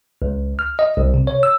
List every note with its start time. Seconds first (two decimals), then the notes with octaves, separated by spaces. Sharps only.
0.22 C#2
0.59 F6
0.79 D#5
0.97 C2
1.14 C3
1.27 C#5
1.43 E6